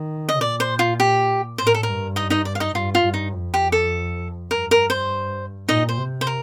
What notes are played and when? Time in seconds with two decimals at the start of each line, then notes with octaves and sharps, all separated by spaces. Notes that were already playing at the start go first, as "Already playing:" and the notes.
Already playing: D#3
0.29 D#5
0.40 A#2 D5
0.60 C5
0.79 F4
1.00 G4
1.57 A2 C5
1.67 A#4
1.74 A4
1.83 G2 A#4
2.16 D#4 D#5
2.30 D#4 D#5
2.45 D5
2.55 F5
2.60 D#4 D#5
2.75 G2 F4
2.95 F4
3.05 G2
3.14 D#4
3.34 F2
3.54 G4
3.72 A4
4.51 G2 A#4
4.71 A#4
4.90 C5
5.68 A#2 D#4 D#5
5.89 C5
5.97 C3
6.21 C5
6.27 A#4